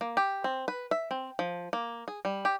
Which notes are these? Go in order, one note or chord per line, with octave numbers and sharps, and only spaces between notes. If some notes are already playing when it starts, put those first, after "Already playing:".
A#3
G4
C4
B4
E5
C4
F3
A#3
G#4
G3
G4